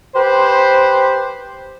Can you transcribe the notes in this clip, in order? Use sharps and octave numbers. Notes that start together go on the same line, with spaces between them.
G4 B4 C5